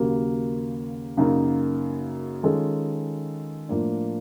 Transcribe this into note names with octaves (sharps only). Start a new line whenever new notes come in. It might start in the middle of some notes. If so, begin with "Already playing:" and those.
Already playing: D#2 C#3 F#3 A#3
F#2 C#3 F#3 A#3 D#4
D#3 G#3 C#4 F4 A4
A2 F3 A#3 D4